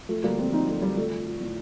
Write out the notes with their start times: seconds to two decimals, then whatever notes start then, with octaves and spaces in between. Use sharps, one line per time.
0.09 F3 A3
0.24 D3 G3 A#3
0.39 F2 A3 C4
0.53 F2 C4 D#4
0.67 F2 A3
0.82 D3 G3
0.97 F3 A3
1.12 F3
1.26 F3
1.41 A2